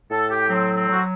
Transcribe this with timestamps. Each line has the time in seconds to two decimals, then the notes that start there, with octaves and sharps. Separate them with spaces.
0.10 A2 A4
0.30 G4
0.49 F#3 C4
0.75 C4
0.88 F#3 F#4